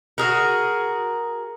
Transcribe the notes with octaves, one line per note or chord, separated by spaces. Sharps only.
F#4 G#4 A#4